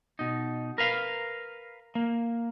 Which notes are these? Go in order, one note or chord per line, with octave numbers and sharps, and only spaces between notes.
B2 D#4
A#4 B4 F5
A#3